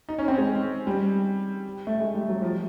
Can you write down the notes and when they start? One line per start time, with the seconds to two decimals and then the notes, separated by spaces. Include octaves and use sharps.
0.09 D#4
0.18 C#4
0.28 C4
0.38 G#3
0.87 G3
1.87 A3
2.00 G#3
2.14 G3
2.29 F#3
2.42 F3